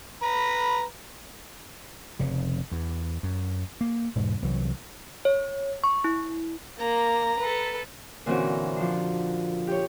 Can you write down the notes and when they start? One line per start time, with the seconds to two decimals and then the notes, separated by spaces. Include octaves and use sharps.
0.23 B4 A#5 B5
2.19 F1 C#3
2.72 E2
3.23 F#2
3.81 A#3
4.15 E1 G#2
4.42 C2 E3 F#3
5.25 C#5
5.84 C#6
6.04 E4
6.79 A#3 A#5
7.39 A4 B4
8.26 A#2 D3 E3 C4 C#4 F#4
8.76 F3 D4
9.67 G4 C#5